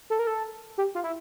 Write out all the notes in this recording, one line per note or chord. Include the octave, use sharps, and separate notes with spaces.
A4
A#4
A4
G4
F4
E4